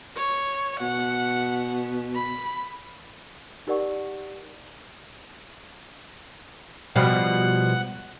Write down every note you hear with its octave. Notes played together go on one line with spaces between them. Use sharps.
C#5
B2 F#5
B5
D#4 G4 A#4 D5 F#5 C#6
B2 F3 G3 F#5